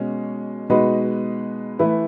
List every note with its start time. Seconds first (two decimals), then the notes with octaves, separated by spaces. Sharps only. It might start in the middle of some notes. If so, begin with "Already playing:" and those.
Already playing: B2 G#3 C#4 F#4
0.70 B2 G#3 D#4 F#4 B4
1.79 E3 A3 E4 B4